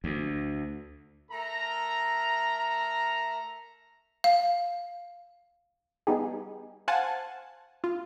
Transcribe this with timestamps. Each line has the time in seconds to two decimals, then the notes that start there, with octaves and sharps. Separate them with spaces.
0.04 D2
1.30 A3 A#4 E5 A#5
4.24 F5
6.07 G3 B3 D#4 G4 G#4
6.88 C5 F5 F#5 G#5 A5
7.84 F4